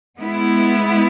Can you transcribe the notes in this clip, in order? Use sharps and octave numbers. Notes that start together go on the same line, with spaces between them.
G#3 B3 E4